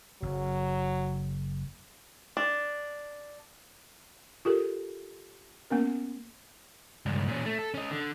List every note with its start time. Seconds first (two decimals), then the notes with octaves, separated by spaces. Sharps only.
0.22 F#1 F#3
2.37 D4
4.45 F4 G4 A4 A#4
5.70 A#3 B3 C#4 A#4
7.06 C#2 G2
7.28 A#2 C#4
7.46 A3
7.59 A4
7.74 C#4 D#5
7.91 D3